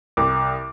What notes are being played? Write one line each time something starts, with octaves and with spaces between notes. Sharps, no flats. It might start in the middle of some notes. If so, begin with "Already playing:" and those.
C2 D6